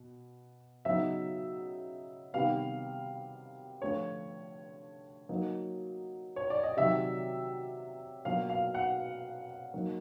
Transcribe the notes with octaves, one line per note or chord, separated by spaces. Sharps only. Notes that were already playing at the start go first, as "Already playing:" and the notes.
Already playing: B2
C#3 F#3 B3 D#4 E5
C3 D#3 G3 B3 F5
D3 F3 A3 D4 C#5
F#3 A#3 D#4
C#5
D5
D#5
C3 D#3 F#3 E5
B2 F#3 A#3 D4 F4 F5
F5
F#5
F#3 A#3 D#4